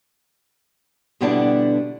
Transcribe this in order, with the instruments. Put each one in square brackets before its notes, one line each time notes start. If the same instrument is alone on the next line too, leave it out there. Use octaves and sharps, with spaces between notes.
[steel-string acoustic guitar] B2 D3 G3 B3 D4 E4